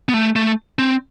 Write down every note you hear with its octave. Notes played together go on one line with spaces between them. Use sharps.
B3
A3
A3
C4